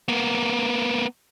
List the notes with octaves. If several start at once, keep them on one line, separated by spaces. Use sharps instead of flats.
A#3 B3